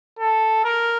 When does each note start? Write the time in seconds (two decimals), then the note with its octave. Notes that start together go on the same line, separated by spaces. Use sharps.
0.19 A4
0.64 A#4